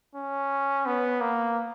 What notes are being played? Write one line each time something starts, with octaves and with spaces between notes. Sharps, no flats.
C#4
B3
A#3